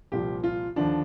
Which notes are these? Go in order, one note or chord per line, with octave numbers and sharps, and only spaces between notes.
C2 A#2 F3 G4
F4
D#2 D3 F3 D4